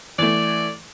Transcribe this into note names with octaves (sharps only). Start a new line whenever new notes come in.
E3 A3 D5